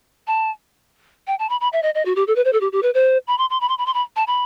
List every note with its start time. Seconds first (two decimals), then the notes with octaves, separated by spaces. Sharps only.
0.27 A5
1.27 G5
1.39 A5
1.49 B5
1.61 B5
1.73 E5
1.83 D#5
1.95 D#5
2.05 F#4
2.16 G4
2.27 A4
2.36 B4
2.45 C5
2.53 A4
2.61 G4
2.72 G4
2.83 B4
2.94 C5
3.27 B5
3.38 C6
3.50 C6
3.61 B5
3.69 C6
3.78 B5
3.86 C6
3.94 B5
4.16 A5
4.27 B5